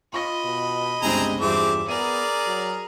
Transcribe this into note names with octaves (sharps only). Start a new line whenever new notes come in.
F4 D#5 B5 C#6 A#6
B2
G1 C#2 C3 C4 D4 G#4 A#5
E2 G2 F3 C4 G#4 E5 D6
B3 G#4 A#4 D5 A#5 D#7
F#3